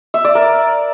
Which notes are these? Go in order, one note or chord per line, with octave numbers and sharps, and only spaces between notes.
E5
D5
A#4